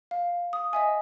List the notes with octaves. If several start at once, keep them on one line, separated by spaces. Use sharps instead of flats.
F5
D#6
D#5 E5 G#5